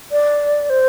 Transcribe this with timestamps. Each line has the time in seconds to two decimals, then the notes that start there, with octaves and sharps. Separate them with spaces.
0.12 D5
0.70 C5